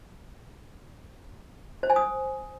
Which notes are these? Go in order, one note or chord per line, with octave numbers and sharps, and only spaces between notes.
C5
G#5
D#6